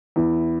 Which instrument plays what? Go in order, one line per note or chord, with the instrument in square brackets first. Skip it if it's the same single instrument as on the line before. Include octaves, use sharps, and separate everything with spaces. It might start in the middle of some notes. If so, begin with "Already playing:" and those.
[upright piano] E2 [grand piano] E4